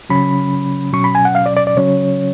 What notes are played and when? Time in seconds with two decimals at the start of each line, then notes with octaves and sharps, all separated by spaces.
0.10 C#3 F#3 C#4 B5
0.93 B2 F#3 C#4 C#6
1.04 B5
1.15 G#5
1.25 F#5
1.35 F5
1.46 D5
1.57 D5
1.67 D5
1.76 C#3 F#3 C#4 C#5